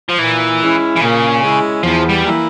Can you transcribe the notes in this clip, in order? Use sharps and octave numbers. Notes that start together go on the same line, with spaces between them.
F3
A#2 E3
G#3 C#4 E4
E3
A#2 C#3
G#3 C#4 E4
E2 F3
G3
E3 A#3 E4